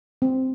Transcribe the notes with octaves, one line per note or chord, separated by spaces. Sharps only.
C4